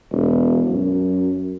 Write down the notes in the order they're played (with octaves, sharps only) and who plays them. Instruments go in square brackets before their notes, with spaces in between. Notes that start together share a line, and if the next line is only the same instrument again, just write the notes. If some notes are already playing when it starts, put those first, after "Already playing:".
[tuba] E1
F#2